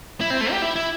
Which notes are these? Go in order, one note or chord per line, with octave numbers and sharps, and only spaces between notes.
E4
C4
A3
G4
E4
E4